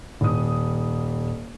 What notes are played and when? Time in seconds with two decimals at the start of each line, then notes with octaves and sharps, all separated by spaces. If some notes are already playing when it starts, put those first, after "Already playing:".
0.21 D#1 D#6